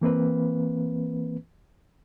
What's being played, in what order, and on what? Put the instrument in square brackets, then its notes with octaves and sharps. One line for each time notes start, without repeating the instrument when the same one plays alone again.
[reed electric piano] E3 A#3 C4 B4